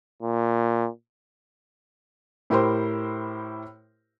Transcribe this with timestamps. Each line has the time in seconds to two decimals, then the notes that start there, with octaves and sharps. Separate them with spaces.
0.22 A#2
2.50 A2 E4 G4 A#4 C5 C6